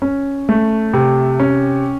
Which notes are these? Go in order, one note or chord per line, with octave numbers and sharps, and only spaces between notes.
C#4
A3
C3
C#4